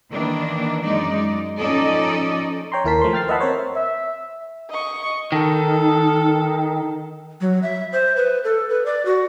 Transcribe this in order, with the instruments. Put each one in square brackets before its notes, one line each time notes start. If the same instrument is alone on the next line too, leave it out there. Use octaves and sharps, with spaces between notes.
[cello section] D#3 E3 A#3 D4
F#2 G#3 D#4 D5
F3 C#4 D#4 A4 D5 D#5
[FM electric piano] C#5 G5 A#5 C6
D#2 E4 A#4 A5 B6
F3 A3 C5 C6
G5 F6 A6 C7
B4 D#5 E5 F#5 A5 B5
C4 A#4 C5 C#5
[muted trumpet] E5
[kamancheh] D#5 C#6
[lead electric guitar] D#3 [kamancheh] A4
[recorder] F#3
E5
C5
B4
A4
B4
D5
F#4